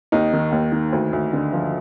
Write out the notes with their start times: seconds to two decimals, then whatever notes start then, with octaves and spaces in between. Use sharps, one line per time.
0.12 D#2 D#4
0.33 D#3
0.52 D#2
0.72 D#3
0.92 D2
1.13 D2
1.33 D3
1.53 F3